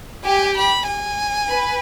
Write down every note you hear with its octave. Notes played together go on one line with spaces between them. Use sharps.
G4 G#5
B5
G#5
B4